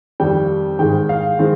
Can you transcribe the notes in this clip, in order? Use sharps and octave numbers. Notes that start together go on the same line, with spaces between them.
F2 D#3 G3 G5
G#2 D#3 G#3 G5
F5
D#3 G#3 C4